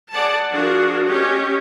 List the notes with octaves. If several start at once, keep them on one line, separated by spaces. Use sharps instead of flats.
G#4 D5 F#5 A5
F3 D4 F4 F#4 G#4 A#4
C#4 G4 C#5 D#5